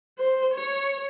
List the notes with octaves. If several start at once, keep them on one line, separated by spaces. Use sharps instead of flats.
C5
C#5